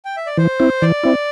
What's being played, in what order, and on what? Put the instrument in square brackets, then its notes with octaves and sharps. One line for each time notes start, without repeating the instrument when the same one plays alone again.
[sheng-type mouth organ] G5
E5
D5
[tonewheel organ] E3 [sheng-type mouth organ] C5
[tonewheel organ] C4 E4
[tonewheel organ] E3 [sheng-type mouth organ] D5
[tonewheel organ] C4 E4